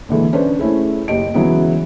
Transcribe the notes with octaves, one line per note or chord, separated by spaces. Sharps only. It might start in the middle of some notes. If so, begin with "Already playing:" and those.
A#2 D3 E3 G#3
C#4 D4 B4 C5
A3 C#4 E4 G#4
F#1 D#2 G4 D#5 D7
C#3 E3 F#3 G#3 B3 C#4